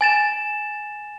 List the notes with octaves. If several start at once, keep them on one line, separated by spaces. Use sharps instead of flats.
G#5 A6 E7